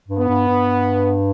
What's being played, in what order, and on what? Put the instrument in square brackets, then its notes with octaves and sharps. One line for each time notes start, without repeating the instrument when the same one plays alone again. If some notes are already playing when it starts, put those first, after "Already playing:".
[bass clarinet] G2
[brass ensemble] B3
[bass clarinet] G2
G2